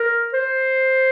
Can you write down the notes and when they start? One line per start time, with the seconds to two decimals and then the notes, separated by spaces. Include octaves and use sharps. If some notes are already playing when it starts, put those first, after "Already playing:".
Already playing: A#4
0.33 C5